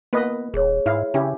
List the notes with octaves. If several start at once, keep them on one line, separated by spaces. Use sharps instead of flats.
A#3 B3 B4 D#5
D#1 G#4 C#5
G#2 E4 F5
C#3 C#4 E4 G4